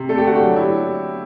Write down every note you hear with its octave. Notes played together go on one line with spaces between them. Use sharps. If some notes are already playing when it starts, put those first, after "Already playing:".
Already playing: C3
A3 A4
G4
D3 F#4
G4
F#3
E4